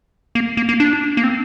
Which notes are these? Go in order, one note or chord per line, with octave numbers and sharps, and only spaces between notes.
A#3
A#3
A#3
D4
A#3
C4